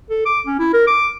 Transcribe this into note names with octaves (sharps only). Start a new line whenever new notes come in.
A4
D6
C#4
E4
A#4
D6